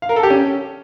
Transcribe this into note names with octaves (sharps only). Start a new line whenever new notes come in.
F5
A#4
A4
G4
C#4